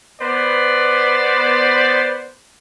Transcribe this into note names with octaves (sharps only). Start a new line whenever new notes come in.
B3 C5 D5